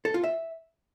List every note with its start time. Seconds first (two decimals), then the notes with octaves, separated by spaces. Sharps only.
0.05 A4
0.14 F4
0.24 E5